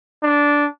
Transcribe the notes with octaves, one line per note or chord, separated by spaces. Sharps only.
D4